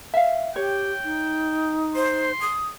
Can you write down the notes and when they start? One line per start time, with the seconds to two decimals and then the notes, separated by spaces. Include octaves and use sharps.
0.14 E5 F5
0.56 G4 C#5 G5
1.04 D#4
1.95 C5 C6
2.41 D#6